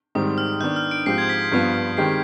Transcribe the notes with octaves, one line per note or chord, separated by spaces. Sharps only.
G#2 D#3 G3 C4 D#6
F6
D#3 B3 D4 G6
F6
D7
G#2 F3 C4 G4 C7
G#6
B6
G2 F3 B3 F4
D#3 G#3 C4 G4 C7